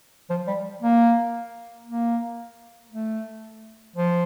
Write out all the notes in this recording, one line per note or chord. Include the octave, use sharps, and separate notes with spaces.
F3
G3
A#3
A#3
A3
F3